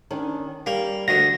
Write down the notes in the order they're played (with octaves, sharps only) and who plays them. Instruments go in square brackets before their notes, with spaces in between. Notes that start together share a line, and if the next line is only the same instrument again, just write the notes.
[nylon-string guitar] D#3 C#4 D4
[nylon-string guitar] G3 [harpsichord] A#3
[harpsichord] D2 D3 [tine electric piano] A#6